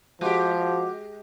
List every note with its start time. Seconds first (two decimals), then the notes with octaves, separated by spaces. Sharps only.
0.21 F3 G#3 F#4 G4 F#5 D6